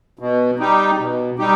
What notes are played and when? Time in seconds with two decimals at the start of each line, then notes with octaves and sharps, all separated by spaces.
0.19 B2
0.59 G3 D#4 G4
0.99 B2
1.38 G3 D#4 G4